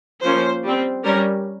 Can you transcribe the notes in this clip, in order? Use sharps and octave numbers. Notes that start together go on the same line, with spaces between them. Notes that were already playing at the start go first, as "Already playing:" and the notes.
F3 A#3 C#4 C5
G3 C4
G3 C#4 A#4